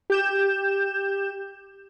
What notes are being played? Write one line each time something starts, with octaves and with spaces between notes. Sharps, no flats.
G4 G6 E7